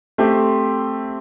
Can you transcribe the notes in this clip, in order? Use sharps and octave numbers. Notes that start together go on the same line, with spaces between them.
A3 C4 G4 C5